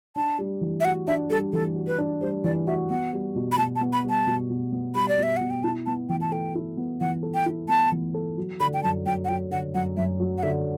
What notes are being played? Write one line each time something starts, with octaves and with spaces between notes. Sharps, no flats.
D4 A5
G3
E3
E5
F#4 F#5
D4 E5
G3 A4
E3 A4
F#4
B4
D4
G3 C5
E3 D5
F#4 E5
B3 F#5
G3
B2
B5
B2 A5
A5
B3
B5
G3
A5
B2
B2
B3
G3 B5
D5
B2 E5
B2 F#5
G5
E4 A5
B3 A5
E3 G5
A5
A4 G5
E4
B3
E3 F#5
A4
G5
E4
B3 A5
E3
A4
F#3
D3 B5
G5
F#2 A5
F#2 G5
F#5
F#3 G5
D3 F#5
F#2 F#5
F#2 E5
F#3
F#5
D3 E5